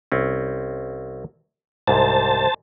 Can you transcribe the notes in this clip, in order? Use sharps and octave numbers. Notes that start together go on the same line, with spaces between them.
C2 C4 C#4
C2 G#2 C5 A5